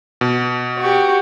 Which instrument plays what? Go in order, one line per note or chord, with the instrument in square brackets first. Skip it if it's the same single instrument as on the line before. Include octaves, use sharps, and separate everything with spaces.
[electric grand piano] B2
[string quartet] F#4 G4